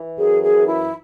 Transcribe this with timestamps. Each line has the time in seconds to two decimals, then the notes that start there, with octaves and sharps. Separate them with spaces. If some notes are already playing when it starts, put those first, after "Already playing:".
Already playing: E3
0.18 F#2 G#4
0.42 G#4
0.55 E3
0.67 E4